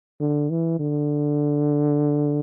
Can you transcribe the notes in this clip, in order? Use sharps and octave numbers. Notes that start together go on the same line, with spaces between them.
D3
E3
D3